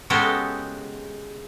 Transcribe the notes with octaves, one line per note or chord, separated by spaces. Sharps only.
C#3 G#3 B3 F#4 G4 A4